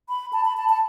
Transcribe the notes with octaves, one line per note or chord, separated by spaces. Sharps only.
B5
A5
B5
A5
A5